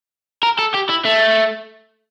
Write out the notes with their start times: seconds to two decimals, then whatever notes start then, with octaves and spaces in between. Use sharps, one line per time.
0.43 A#4
0.59 A4
0.75 G4
0.90 E4
1.05 A3